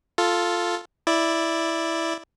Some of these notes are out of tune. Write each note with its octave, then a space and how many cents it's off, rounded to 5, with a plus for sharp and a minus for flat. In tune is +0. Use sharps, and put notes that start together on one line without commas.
F4 +0 A4 +0
E4 +0 D5 +0